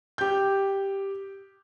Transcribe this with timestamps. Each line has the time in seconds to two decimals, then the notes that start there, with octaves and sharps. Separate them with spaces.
0.18 G4 G6